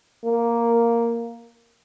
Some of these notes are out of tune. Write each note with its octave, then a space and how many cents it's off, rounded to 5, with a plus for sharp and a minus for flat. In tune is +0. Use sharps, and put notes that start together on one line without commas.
A#3 +0